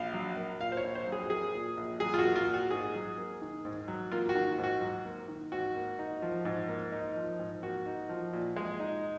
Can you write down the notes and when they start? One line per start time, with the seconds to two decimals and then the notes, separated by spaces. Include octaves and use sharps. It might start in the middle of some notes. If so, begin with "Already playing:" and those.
Already playing: A#1 F5
0.14 F#3
0.36 A#3
0.60 A#2 F5
0.72 C5
0.77 C#5
0.83 A#1
0.95 C5
1.07 F#3
1.12 G#4
1.30 A#3 G#4
1.54 A#2
1.77 A#1
2.00 F#3 G#4
2.14 F4
2.19 F#4
2.24 A#3
2.36 F4
2.47 A#2
2.54 F#4
2.70 G#2 G#4
2.94 F#3
3.18 A#3
3.41 D#3
3.65 G#2
3.88 F#3
4.12 A#3 F4
4.29 F#4
4.35 D#3
4.58 G#2
4.64 F#4
4.81 F#3
5.05 A#3
5.28 D#3
5.52 G#2 F#4
5.76 A#3
5.99 D#4
6.22 F3
6.45 G#2
6.69 A#3
6.92 D#4
7.16 F3
7.39 G#2
7.63 A#3 F#4
7.86 D#4
8.09 F3
8.33 A#2
8.56 G#3
8.80 D#4